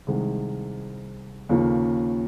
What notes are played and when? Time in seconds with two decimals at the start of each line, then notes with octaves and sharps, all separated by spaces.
0.07 C2 C3 D#3 G#3
1.49 D#2 C#3 F3 A#3